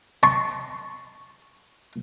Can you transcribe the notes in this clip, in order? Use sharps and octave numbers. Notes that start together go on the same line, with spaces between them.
A5 C6 C#6